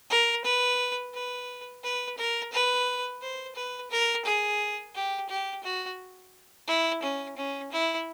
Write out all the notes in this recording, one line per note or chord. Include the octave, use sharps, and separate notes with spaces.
A#4
B4
B4
B4
A#4
B4
C5
B4
A#4
G#4
G4
G4
F#4
E4
C#4
C#4
E4